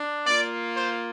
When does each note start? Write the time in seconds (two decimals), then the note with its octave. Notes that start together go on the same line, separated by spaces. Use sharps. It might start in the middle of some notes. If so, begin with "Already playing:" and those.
Already playing: D4
0.26 A#3 F4 D5
0.75 C5